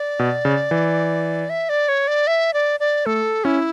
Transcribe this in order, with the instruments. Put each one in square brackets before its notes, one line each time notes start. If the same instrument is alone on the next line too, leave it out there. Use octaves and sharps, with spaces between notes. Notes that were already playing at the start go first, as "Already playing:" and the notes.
Already playing: [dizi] D5
[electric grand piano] B2
C#3
E3
[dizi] E5
D5
C#5
D5
E5
D5
D5
[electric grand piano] A3 [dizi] A4
[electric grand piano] C#4 [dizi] E4